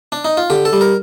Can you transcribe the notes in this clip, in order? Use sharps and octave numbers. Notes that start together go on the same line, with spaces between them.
D4
D#4
F4
D3 G4
A4
G3
A#4